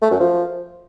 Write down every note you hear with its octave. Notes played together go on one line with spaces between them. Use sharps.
A3
F#2
F3